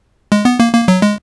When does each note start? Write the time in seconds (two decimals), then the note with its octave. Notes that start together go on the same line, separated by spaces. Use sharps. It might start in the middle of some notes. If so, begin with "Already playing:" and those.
0.32 G#3
0.45 B3
0.60 A#3
0.74 A#3
0.88 F#3
1.02 G#3